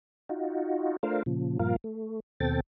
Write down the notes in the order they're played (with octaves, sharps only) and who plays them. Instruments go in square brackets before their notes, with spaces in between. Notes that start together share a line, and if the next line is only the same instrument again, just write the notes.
[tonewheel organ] D#4 F4 F#4
A3 D4 F4 A#4 C5 F5
A#2 C#3 F3
G2 A#2 F3 F4 A#4 F5
A3
D#2 B2 C4 A4 G5 A6